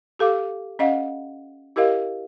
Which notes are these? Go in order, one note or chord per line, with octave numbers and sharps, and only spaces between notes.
G4 A4 F5 D6
C#4 D#5 F5 F#5
E4 G4 A#4 D#5 F5